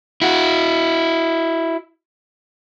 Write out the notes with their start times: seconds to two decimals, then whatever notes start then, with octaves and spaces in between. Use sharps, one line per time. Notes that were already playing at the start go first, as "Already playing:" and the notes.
0.22 E4 F#4